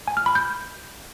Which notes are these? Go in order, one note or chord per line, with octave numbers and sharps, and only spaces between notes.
G#5
F6
B5
G6